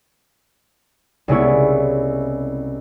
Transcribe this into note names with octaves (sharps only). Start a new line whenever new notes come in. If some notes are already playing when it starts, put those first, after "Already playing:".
C2 C#3 G#3 B3 E4 C#5